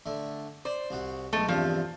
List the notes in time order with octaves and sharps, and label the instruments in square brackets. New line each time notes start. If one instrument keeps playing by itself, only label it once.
[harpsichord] D3 A3
[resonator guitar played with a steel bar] C5 [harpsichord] D5
[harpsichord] C2 F#4
[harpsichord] B1 G#2 G#3 [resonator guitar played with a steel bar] A3
[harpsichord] E2 G2 C3 [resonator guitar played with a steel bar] F3